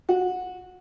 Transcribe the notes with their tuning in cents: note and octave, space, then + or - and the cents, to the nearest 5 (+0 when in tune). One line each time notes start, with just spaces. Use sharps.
F#4 -20